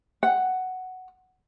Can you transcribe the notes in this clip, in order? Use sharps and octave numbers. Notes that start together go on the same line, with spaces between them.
F#5